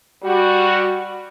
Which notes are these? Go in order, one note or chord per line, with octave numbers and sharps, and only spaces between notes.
G3 F#4